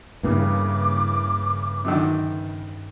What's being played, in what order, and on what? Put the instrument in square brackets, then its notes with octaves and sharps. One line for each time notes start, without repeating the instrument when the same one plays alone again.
[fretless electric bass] G2 [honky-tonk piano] C#3 E3 A#3 [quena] D6
[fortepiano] F#2 D3 D#3